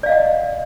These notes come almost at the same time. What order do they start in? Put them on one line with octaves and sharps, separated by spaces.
D5 F5 D#5 F#5